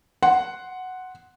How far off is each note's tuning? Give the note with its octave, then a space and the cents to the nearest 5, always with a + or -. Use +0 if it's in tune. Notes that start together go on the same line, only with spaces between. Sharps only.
F#5 +0 C6 +0